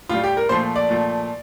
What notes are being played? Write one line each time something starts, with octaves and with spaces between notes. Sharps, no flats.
A2 G3 F4
G4
A#4
A#2 F3 A3 C5
D5
A#2 F3 A3